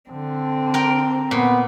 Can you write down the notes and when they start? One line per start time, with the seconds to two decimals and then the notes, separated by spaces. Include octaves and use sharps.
0.11 D3 C4
0.74 A#4 G5
1.31 A#2 B3